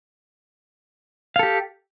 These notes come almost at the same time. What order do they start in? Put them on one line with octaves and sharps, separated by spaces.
F5 A4 G4